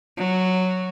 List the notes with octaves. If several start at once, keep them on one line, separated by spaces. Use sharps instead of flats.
F#3